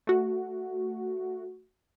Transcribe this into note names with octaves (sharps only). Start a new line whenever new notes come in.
A3 F#4